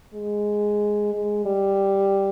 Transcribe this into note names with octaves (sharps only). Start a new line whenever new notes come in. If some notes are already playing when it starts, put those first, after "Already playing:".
G#3
G#3
G3